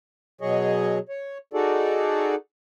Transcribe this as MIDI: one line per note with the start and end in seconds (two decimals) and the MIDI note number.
0.41 0.99 47
0.41 0.99 54
0.41 0.99 68
0.41 0.99 73
0.41 0.99 75
1.09 1.38 73
1.53 2.35 63
1.53 2.35 66
1.53 2.35 68
1.53 2.35 69
1.53 2.35 74